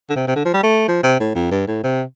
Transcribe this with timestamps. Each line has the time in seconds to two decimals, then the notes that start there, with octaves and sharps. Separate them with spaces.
0.10 D3
0.16 C3
0.27 C3
0.36 D3
0.45 F3
0.54 G3
0.63 A3
0.88 F3
1.03 C3
1.20 A2
1.35 F2
1.51 G2
1.68 A2
1.84 C3